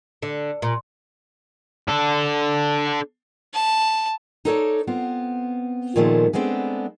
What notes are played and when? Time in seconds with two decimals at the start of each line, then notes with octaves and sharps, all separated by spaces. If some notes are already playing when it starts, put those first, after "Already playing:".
0.22 D3
0.62 A#2
1.88 D4 A4
3.54 A5
4.45 D#4 A4 C#5 D5
4.87 B3 C4 F4
5.96 A#2 D#3 F3 G#3 A3
6.33 G#3 A3 B3 C4 D4